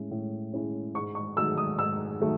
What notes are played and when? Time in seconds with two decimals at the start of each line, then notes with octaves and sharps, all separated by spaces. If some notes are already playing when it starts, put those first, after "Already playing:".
Already playing: A2 G#3 C#4 E4
0.11 A2
0.53 G#3 C#4 E4
0.94 G#2 C#6
1.15 C#6
1.36 D#3 F#3 A3 E6
1.57 D#6
1.78 G#2 E6
2.21 D#3 F#3 A3